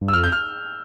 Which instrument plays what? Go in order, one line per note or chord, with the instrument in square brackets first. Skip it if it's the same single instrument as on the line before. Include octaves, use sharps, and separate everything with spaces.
[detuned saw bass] G2
[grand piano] E6
[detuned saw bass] F2 [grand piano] F6
[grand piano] G6
F6